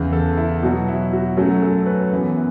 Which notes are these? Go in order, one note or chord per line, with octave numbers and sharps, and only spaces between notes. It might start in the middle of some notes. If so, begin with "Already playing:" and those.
Already playing: E2 C#3 E3
A4
E4
B2 F#3 B3 F#4
E4
F#4
F#2 F#3 A3 C#4 F#4
A4
B4
F#2 E3 B3